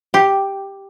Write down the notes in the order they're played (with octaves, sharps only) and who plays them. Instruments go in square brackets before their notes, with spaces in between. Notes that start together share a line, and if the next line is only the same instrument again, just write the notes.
[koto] G4